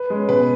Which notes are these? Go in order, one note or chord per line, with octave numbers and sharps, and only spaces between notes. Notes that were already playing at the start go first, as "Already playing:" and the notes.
Already playing: B4
G#3 C#4
B2 B4